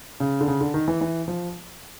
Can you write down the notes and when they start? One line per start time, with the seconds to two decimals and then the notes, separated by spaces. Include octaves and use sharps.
0.20 C#3
0.41 D3
0.48 C#3
0.61 D3
0.74 D#3
0.88 E3
1.01 E3
1.28 F3